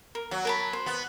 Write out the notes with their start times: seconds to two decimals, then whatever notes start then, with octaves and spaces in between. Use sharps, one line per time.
0.15 A#4
0.31 F#3 F#5
0.45 A#4 A5 B5
0.73 C5
0.86 B3